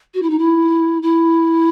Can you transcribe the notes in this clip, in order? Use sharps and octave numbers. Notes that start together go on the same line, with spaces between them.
F#4
E4
D#4
E4
E4